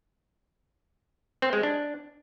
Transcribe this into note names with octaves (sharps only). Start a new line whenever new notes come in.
C4
G#3
D4